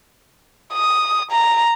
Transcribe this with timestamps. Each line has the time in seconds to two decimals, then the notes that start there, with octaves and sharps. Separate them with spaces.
0.74 D#6
1.32 A#5